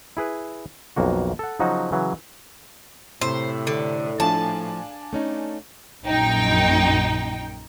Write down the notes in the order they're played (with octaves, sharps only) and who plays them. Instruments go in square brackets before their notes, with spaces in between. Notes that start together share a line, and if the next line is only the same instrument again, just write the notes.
[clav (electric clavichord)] E4 G#4 B4
B1 F2 A#3 F#4
A4 F#5
C#3 F3 F#3 D#4 F#4
C#3 E3 F#3
[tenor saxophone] A2 [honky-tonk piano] C3 [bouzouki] C5
[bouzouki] D3
[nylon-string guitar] F3 A3 [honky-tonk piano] D4 F5 G#5 [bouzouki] A5
[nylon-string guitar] A3 C#4 D#4
[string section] A#1 F#2 D#4 G5